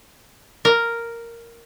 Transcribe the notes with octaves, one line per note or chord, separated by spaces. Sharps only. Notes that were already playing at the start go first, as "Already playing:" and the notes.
A#4